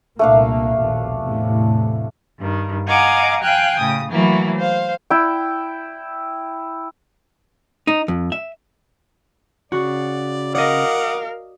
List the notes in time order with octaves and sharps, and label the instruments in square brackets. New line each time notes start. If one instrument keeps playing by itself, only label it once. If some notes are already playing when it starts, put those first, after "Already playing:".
[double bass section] C2 A#2 A#3 [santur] A3 D4 F5
[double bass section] A#1 D#2 B2
E2 A2 C3
[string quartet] G2 D#3
D#5 F5 F#5 G#5 A#5 D6
F5 G5 G#5 F#6
A2 C#3 D#6
E3 F#3 A3 A#3 E4
C5 F5
[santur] E4 G5
[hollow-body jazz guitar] D#4
F2
E5
[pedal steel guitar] C#3 [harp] F#4 [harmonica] D5
[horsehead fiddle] A#4 F5 [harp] D5 D#5 [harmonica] F#5 D6 D#6